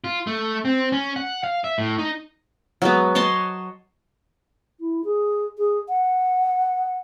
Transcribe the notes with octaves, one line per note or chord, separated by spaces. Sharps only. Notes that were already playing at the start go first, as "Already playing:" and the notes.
F4
A3
C4
C#4
F#5
F5
E5
A2
D#4
F#3 G#3 B3
C#5 D#5 A5 C6
E4
G#4
G#4
F#5